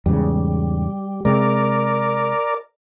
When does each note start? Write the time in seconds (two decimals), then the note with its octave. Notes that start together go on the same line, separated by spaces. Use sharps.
0.06 E2 G#2 C#3 G3
1.25 C3 G#3 A#4 D5